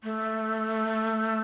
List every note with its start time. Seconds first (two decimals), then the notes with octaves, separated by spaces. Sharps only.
0.04 A3